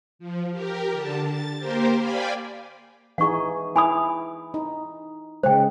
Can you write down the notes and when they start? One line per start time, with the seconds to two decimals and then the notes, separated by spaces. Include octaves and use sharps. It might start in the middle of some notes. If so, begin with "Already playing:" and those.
0.19 F3
0.51 G4 A#4
0.93 D3 A5
1.27 A6
1.58 A#3 G4 A#4 C5
1.99 D5 F5 G5 G#5 B5
3.18 E3 D#4 G#4 F#5 C#6
3.76 E4 G#5 B5 D#6
4.54 D#4
5.43 C#3 G#3 C5 G5